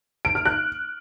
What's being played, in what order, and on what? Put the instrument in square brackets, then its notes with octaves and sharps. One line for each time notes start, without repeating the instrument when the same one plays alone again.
[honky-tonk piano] D7
F6
F#6